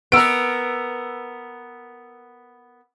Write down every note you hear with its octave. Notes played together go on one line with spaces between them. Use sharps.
B3 A#4 E6 D7